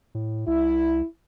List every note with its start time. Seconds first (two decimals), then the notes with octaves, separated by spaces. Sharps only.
0.15 A2
0.47 C2 E4